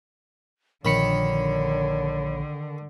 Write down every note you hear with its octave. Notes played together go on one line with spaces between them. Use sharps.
A#1 D3 D#3 C#5 B5 C#7